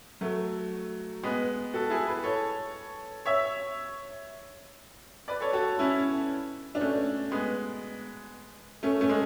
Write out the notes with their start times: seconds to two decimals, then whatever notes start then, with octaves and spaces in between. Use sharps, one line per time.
0.21 F#3 A3
1.23 G#3 B3
1.74 F#4 A4
1.90 E4 G#4
2.07 G#4 B4
2.24 A4 C#5
3.26 C#5 E5
5.28 B4 D5
5.41 A4 C#5
5.53 F#4 A4
5.79 C#4 E4
6.75 D4
6.80 A3 C#4
7.31 G#3 B3
8.83 A3 C#4
9.01 A3 C#4
9.09 G#3